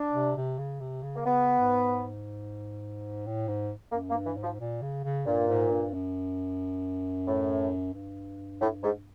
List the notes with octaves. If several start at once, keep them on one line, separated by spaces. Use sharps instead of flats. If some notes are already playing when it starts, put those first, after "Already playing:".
Already playing: D4
C3
C3
C#3
C3
C#3
A#3
C#3 B3
G#2
A2
G#2
F#2 A#3
A#3
G2
E3
G#2
F3
A#2
C#3
C#3
G2 A#2
G#2
G2
F#2
A2
G2
A2
G#2